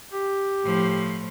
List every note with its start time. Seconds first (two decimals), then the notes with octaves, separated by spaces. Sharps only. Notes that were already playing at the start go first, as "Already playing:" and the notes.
0.13 G4
0.64 A2 F3